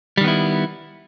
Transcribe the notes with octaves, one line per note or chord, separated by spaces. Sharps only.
D#3 G3 B3 E4